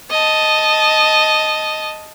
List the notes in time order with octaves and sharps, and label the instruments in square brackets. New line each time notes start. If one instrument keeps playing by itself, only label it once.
[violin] D#5 A5